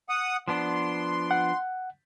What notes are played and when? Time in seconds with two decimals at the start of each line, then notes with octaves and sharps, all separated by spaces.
0.09 F#5 D#6
0.48 F3 B3 D4 C6
1.31 F#5